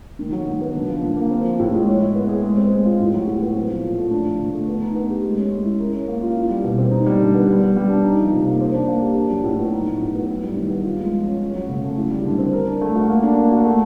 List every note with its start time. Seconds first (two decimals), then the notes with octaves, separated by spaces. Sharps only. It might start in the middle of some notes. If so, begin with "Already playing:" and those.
0.19 D#3
0.32 F#3
0.46 D#3
0.61 B3
0.74 D3
0.88 F3
1.02 D3
1.16 A#3
1.30 C4
1.45 F3
1.59 A2
1.73 G#3
1.87 C#5
2.01 E4
2.15 B3
2.28 G#4
2.43 G#3
2.57 C4
2.71 G#3
2.85 F4
3.00 A2
3.14 F#3
3.27 A2
3.41 B3
3.55 C4
3.70 F3
3.83 A#2
3.97 A3
4.11 D4
4.26 F3
4.39 D3
4.53 A3
4.68 B3
4.82 D#4
4.95 B3
5.10 G4
5.24 G#3
5.37 C#4
5.52 G#3
5.65 E4
5.79 A#4
5.93 C#4
6.08 A#3
6.22 F4
6.35 E4
6.49 G3
6.63 B2
6.78 C4
6.91 D#4
7.06 G3
7.20 D3
7.34 B3
7.47 G3
7.63 B3
7.76 G3
7.89 D4
8.04 D#4
8.19 F3
8.32 C3
8.47 A#3
8.61 C5
8.74 D4
8.88 A#3
9.02 G4
9.16 D4
9.30 F#3
9.44 A2
9.59 B3
9.72 D#4
9.86 F#3
10.01 A2
10.14 B3
10.29 E4
10.43 G3
10.56 D#3
10.70 B3
10.84 F4
10.99 G#3
11.13 F3
11.27 C#4
11.41 C#4
11.54 F#3
11.69 C#3
11.83 A3
11.97 E4
12.10 G3
12.25 D3
12.38 C4
12.53 A#4
12.67 D4
12.81 A3
12.96 F#4
13.08 A#3
13.23 D4
13.38 A#3
13.51 F#4
13.65 A3